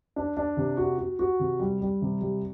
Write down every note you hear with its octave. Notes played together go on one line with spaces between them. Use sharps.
D4
D4
C3
F#4
F#4
F#4
C3
G3
G3
C3
G3